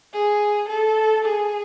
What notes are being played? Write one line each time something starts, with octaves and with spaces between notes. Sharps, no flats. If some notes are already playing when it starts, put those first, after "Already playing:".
G#4
A4
G#4